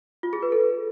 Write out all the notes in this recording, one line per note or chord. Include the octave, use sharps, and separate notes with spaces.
F4
G#4
B4
A4